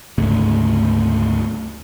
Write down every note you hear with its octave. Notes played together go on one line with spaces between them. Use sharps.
D2 G#2 C#3 A3